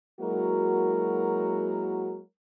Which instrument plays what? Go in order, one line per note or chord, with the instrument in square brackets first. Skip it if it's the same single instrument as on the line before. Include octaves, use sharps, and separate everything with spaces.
[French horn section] F#3 G#3 A#3 E4 F#4 A#4